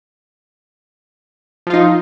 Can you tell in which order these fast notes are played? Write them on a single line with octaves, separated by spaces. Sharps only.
F3 F4 D#4